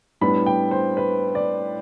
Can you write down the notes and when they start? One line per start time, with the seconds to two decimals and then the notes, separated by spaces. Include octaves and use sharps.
0.21 A2 G3 B3 D4 B5
0.46 G5
0.71 C5
0.97 B4
1.35 D5